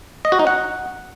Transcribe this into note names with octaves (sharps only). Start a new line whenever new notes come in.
D#5
F#4
D#4
F#5